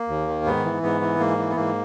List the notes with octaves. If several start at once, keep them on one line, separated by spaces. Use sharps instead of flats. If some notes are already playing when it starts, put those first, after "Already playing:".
Already playing: A#3
D#2
D#3
G#2 B3
E3
G#2 B3
E3
G#2 A#3
E3
B3
G#2 A#3